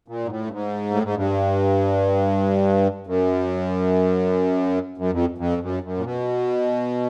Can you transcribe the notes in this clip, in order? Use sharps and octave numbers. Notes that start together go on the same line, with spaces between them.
A#2
G#2
A2
G2
G#2
A2
G#2
G2
F#2
F#2
F2
F2
F#2
F#2
A#2
B2